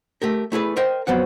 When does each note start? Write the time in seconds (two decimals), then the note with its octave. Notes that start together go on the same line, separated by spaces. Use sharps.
0.22 A3 G4 A#4
0.52 A3 E4 G#4 B4
0.76 A#4 C5 D#5 G5
1.07 F2 F#3 B3 C4 F#5